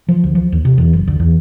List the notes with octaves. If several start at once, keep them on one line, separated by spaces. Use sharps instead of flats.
F3
D2
F3
D#2
C3
E2
F#1
D2
E2